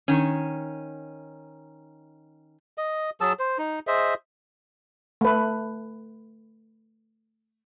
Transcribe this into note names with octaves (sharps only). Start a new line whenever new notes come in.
D#3 C#4
D#5
F#3 G#4 A5 E6
C5
D#4
G#4 C5 D#5 E5
A3 B4